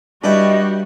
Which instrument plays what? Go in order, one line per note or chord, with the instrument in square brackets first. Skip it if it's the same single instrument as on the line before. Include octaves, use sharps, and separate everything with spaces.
[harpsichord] G2 E4 [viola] G3 F#4 [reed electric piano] D4 E5 G5 [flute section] D#5